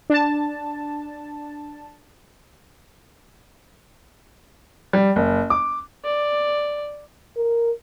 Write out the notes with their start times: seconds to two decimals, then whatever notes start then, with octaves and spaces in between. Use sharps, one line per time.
0.10 D4 A5
4.93 G3
5.16 F#1
5.50 D6
6.05 D5
7.37 A#4